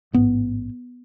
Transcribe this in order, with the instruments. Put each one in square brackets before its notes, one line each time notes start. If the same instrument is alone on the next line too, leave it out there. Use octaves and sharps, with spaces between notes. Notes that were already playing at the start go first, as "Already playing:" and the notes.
[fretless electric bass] A1 G#2 B3